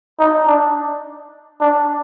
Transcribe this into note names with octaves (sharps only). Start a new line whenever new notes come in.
D#4
D4
D4